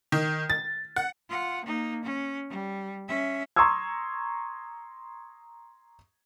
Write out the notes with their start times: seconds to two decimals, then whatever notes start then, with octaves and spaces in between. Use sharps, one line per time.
0.12 D#3
0.50 A6
0.96 F#5
1.29 F4 F#5
1.64 A#3 D#4
2.03 C#4
2.49 G3
3.08 C#4 E5
3.56 A#5 C6 C#6 D#6 E6 G#6